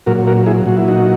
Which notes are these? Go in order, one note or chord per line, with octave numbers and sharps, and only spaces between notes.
A#2 F#3 F#4 A#4
F#4 A#4
E4 G#4
A#2 F#3 F#4
E4
D#4 F#4